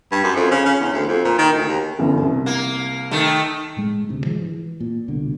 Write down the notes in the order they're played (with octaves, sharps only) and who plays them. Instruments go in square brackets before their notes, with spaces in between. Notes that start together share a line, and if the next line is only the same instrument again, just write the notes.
[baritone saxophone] G2
F#2
F2
C#3
C#3
E2
D2
F2
A#2
D#3
D2
D#2
[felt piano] G1 F#2 E3
C2
[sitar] A#3
D#3 A3
[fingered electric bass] A2 G#3
D2 G#2 C3
D#3 F3 G#3
E3
A#2
C2 B2 D3